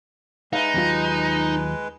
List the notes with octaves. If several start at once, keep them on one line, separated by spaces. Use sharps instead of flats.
G#3 D#4 B4 E5 F5
D#2 F#3 F4